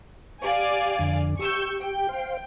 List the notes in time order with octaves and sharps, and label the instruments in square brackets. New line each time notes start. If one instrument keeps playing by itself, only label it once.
[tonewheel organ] G4 [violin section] D5 F5 G#5
[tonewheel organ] F2 D3
[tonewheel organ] G4 [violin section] C#6 E6 G6
[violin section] G5
[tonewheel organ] C5 F5